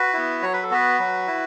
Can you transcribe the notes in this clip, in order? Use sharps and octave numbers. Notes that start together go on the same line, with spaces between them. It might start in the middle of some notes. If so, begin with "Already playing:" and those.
Already playing: F#4 B4
B3 E4
F#3 C#5
B4
A4
B3 F#4 B4
F#3
E4